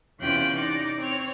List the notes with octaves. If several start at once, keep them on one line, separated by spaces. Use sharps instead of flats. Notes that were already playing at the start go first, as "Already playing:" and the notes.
E2 C3 C#4 F4 G5 F#6
D#4 D5
C4 C#5 F6